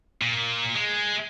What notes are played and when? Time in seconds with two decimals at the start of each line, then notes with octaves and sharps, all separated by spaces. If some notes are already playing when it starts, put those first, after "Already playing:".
0.22 A#2
0.75 G#3